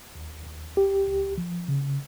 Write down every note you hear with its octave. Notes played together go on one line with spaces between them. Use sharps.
D#2
D#2
C#2 G4
C#2
F3
C#3